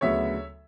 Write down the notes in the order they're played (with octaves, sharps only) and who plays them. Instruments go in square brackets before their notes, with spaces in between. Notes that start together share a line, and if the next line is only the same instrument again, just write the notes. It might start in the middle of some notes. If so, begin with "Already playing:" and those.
[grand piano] D2 C#3 F#3 B3 C#5 E5